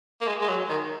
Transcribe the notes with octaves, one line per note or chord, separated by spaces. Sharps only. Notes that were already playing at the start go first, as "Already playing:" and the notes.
A#3
G#3
G#3
F#3
D#3